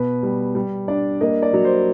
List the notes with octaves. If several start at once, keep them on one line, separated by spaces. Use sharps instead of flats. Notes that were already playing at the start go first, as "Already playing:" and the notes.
Already playing: B2 B4
G3
G3
D4 D5
A#3 D#5
D5
F#3
C5